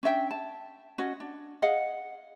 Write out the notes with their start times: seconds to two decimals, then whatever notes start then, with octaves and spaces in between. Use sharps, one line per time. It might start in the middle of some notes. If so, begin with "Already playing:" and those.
0.03 C#4 D4 E5 G5
0.31 A5
0.98 C#4 F#4 D#5
1.20 D4
1.62 G#4 D#5 F5 F#5